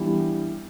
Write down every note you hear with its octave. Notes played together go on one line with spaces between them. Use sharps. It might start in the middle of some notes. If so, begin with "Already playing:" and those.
Already playing: E3 G3 B3 D4 G4